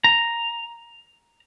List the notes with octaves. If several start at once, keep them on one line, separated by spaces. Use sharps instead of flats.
A#5